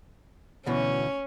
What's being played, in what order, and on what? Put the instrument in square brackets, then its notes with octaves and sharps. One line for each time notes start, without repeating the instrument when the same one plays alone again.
[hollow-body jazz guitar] D2 B2 E3 [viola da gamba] C#4